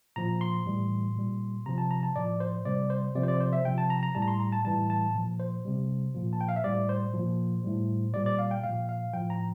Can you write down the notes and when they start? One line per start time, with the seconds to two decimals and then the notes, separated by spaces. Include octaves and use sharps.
0.16 A#2 F3 A#5
0.41 C6
0.66 A2 E3 G3
1.16 A#2 G3
1.66 C3 F3 A#5
1.78 A5
1.91 A#5
2.03 A5
2.16 A2 F3 D5
2.40 C5
2.65 C3 G3 D5
2.90 C5
3.15 C3 F3 D5
3.23 C5
3.28 D5
3.40 C5
3.53 E5
3.65 C3 F3 G5
3.78 A5
3.90 A#5
4.03 A#5
4.15 A2 G3 A5
4.22 A#5
4.28 C6
4.40 A#5
4.52 A5
4.65 A2 E3 G3 A5
4.90 A5
5.15 A#2 F3
5.40 C5
5.65 C3 G3
6.15 A#2 F3
6.33 A5
6.41 G5
6.49 F5
6.56 E5
6.64 A2 G3 D5
6.89 C5
7.14 A#2 F3
7.64 A2 G3
8.14 A#2 G3 D5
8.26 D5
8.39 F5
8.51 G5
8.63 A#2 F3 F5
8.89 F5
9.13 A2 F3 G5
9.30 A#5